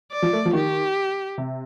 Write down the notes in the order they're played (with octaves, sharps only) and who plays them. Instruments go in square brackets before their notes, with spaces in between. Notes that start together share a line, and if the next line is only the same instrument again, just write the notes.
[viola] D5
[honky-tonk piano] F3
A3
F3
[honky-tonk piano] D#3 [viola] G4
[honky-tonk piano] C3